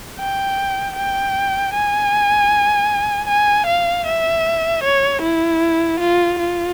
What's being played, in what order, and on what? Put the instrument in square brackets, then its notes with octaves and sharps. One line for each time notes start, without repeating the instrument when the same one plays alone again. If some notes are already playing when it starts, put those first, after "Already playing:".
[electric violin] G5
G5
G#5
G#5
F5
E5
C#5
E4
F4
F4